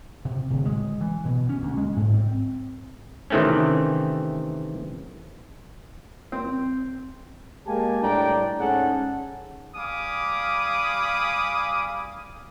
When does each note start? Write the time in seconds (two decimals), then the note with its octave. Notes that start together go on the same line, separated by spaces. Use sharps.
0.25 C3
0.50 D1
0.65 G#3
1.01 E3
1.25 B2
1.49 C#4
1.62 D2
1.78 G#3
1.96 G#2
2.14 C4
3.30 C3 D#3 E3 A3 C4 C#4
6.32 C4
7.67 G#3 A#3 G4 G#5 A5
8.02 A2 G3 D4 D5 G5 A#5
8.60 G#2 C#4 G#4 A4 F#5
9.76 G3 F5 G#5 B5 D6 D#6